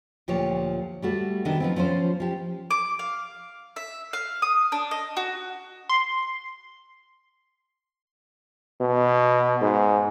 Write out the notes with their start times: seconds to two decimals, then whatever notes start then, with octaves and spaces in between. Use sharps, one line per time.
0.28 D2 A#2 F3 G4 C#5
1.02 G3 A3 F#4
1.45 C3 D#3 B3 D4
1.60 F3 B3 C4
1.76 F3 C#4 F4 C5
2.20 F3 G4
2.71 D6
2.99 F5
3.76 E5
4.13 F5
4.42 D#6
4.72 D4
4.91 D#5
5.17 F#4
5.90 C6
8.81 B2
9.61 G#2